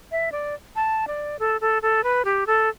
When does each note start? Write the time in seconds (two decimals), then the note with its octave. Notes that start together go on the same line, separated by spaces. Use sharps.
0.12 E5
0.32 D5
0.76 A5
1.07 D5
1.39 A4
1.61 A4
1.82 A4
2.04 B4
2.25 G4
2.47 A4